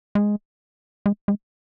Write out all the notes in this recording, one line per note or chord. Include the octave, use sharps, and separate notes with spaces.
G#3
G#3
G#3